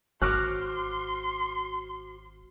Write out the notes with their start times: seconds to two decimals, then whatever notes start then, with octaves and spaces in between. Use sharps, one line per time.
0.22 G#1 F#4 C5 C#5 C6 D6 F6 F#6